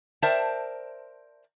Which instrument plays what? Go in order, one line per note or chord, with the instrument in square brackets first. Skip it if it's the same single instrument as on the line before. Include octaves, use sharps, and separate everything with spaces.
[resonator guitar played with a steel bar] A#4 C5 D5 E5 G5 A5